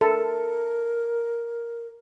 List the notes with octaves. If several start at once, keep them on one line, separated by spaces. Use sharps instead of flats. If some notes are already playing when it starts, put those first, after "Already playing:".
A4 A#4